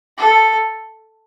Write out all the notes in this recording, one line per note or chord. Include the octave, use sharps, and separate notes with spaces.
A4